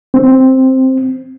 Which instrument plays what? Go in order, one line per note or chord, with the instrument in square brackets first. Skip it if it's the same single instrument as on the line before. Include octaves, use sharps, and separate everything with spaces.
[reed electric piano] C4